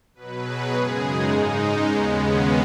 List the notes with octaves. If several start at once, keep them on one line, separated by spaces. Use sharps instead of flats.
B2 F#3 B4
G#4
F#2 C#3 G#3
D#4
G#2 G#3
C#4
D#2 C#3 G#3 B3
C#4